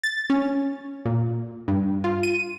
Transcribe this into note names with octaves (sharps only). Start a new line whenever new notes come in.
A6
C#4
A#2
G2
F4
D#7